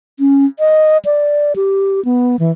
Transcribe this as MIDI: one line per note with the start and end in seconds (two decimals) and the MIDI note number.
0.19 0.46 61
0.59 0.98 75
1.05 1.53 74
1.56 2.03 67
2.05 2.36 59
2.39 2.51 52